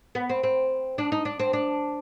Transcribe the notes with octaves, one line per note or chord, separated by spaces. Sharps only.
B3
C4
C4
D4
D#4
D4
C4
D4